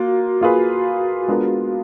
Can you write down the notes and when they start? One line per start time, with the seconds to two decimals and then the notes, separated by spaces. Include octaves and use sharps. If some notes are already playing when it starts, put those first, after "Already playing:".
Already playing: A#3 F4 F#4
0.41 A#3 F4 G#4 B4
1.28 G#3 B3 D4 F4 A#4